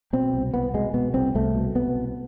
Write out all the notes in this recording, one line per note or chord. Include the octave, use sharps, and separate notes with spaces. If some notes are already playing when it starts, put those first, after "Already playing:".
B2 C4
C2
C2 B3
B2 G#3
B2 B3
C2 C4
C2 A3
B2
B2 B3
C2